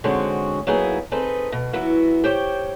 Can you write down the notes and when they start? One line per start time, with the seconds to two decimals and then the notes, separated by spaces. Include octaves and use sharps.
0.04 G#2 D3 G#3 C4 C#4 F#4
0.67 F#3 A#3 B3 D#4 E4 G#4
1.12 C4 D#4 G#4 A4 B4
1.52 B2
1.73 E3 F#3 B3 E4 F#4
2.24 G4 C5 C#5 G5